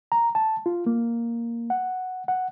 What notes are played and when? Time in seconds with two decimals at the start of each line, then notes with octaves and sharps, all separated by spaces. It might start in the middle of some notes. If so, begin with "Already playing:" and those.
0.12 A#5
0.35 A5
0.66 F4
0.86 A#3
1.70 F#5
2.28 F#5